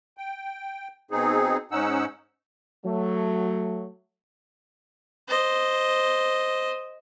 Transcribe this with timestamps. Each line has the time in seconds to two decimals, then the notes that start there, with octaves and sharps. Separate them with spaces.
0.17 G5
1.11 B2 C4 D#4 G#4
1.72 G#2 C#4 D#4 F#5 E6
2.86 F#3 A3
5.28 C5 D#5